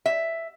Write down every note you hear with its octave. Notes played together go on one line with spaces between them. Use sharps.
E5